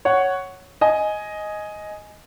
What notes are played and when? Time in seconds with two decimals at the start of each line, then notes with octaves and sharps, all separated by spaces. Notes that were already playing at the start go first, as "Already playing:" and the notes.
0.05 C#5 F#5
0.81 D#5 G#5